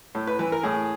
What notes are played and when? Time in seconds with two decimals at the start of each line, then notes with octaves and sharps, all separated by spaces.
0.15 A2
0.27 B4
0.39 E3 B4
0.52 A#4
0.63 A2 G#4